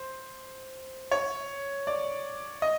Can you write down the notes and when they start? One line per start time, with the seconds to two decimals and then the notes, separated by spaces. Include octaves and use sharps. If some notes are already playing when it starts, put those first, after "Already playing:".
Already playing: C5
1.11 C#5
1.87 D5
2.62 D#5